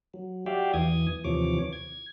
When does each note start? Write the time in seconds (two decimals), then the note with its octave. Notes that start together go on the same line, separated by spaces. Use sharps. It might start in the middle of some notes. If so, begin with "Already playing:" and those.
0.14 F#3
0.46 F#4 G4 D5 E5 F5 G5
0.74 E2 E3 D#6 G#6
1.24 D#2 C3 E3 F3 C#5 D6
1.73 G#6